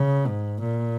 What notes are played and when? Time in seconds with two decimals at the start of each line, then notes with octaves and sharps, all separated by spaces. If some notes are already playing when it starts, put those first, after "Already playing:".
Already playing: C#3
0.26 G#2
0.60 A#2